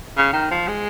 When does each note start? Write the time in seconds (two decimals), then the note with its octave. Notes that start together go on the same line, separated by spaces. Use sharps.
0.17 C#3
0.33 D#3
0.51 F3
0.68 G#3